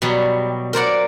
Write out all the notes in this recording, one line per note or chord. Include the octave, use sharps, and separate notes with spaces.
B2 F#3 G3
A#4 C5 D5 F#5